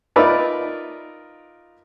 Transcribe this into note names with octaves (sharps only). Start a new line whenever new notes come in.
D#4 F4 A#4 B4 D5 E5